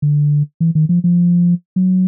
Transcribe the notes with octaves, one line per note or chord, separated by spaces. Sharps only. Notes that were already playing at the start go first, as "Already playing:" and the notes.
D3
E3
D#3
F3
F3
F#3